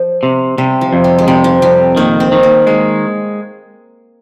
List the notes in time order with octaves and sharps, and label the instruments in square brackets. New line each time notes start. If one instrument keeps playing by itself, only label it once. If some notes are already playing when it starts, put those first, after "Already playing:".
Already playing: [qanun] F3
[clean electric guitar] C3
[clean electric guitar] C3 [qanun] G3
[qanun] F3
[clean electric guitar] F2
[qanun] G3
G#3
[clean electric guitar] C3 [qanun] G3
[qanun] F3
[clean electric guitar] F2 [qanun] G3
[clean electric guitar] D#3 [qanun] A#3
[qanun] C4
[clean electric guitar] D#3
[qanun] A#3
[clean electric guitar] G#3 [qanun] A#3